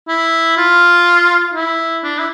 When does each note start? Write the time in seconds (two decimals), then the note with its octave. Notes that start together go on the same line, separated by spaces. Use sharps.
0.08 E4
0.57 F4
1.54 E4
2.03 D4
2.19 E4